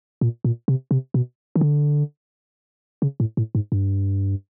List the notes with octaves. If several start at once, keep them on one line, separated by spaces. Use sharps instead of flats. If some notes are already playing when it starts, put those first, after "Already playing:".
A#2
A#2
C3
C3
B2
D#3
D3
C#3
A2
A2
G#2
G2